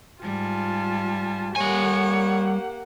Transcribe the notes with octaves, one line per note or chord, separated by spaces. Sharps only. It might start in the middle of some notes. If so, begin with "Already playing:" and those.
G#2 G3 F4 G#5 A5
G3 A#3 G4 C#5 F#5 G#5